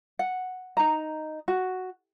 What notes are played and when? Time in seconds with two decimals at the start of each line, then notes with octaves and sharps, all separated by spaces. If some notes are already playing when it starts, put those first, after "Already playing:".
0.19 F#5
0.77 D#4 A#5
1.48 F#4